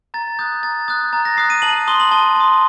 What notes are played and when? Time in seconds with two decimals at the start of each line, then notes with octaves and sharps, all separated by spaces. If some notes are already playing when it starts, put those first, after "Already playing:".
0.14 A#5 A6
0.39 D#6 F#6 G6
0.63 A#5 A6
0.88 D#6 F#6 G6
1.13 A#5 A6
1.25 A#6
1.37 D#6 F#6 C7
1.50 D#7
1.62 A5 F#7
1.88 C6 D#6 G7
2.00 F#7
2.11 A5 G7
2.36 C6 D#6